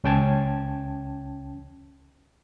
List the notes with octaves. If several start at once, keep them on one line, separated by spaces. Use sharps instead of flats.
C#2 C#4 G5 A5 G#6